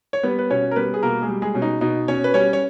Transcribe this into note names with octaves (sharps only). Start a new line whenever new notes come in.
C#5
G3 B3 B4
B4
B2 C#4 C#5
A#4
G3 B3 B4
G#4
B2 A#3 A#4
G#3 G#4
G3
G#3 G#4
B2 C#4
D#4
B2 D#4
B2 C#4 C#5
B4
G3 C#4 C#5
C#5